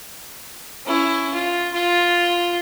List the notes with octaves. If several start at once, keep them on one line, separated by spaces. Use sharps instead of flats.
C#4 E4
F4
F4